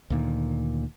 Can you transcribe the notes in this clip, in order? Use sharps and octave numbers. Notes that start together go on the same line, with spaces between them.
D2 A#2 D#3